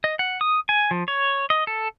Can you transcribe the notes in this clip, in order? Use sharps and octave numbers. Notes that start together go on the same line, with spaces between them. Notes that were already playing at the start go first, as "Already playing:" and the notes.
D#5
F#5
D#6
G#5
F3
C#5
D#5
A4